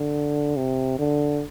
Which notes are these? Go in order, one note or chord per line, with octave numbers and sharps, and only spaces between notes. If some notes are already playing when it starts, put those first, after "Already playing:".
Already playing: D3
C3
D3